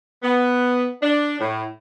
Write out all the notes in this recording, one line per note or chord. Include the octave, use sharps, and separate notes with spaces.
B3
D4
A2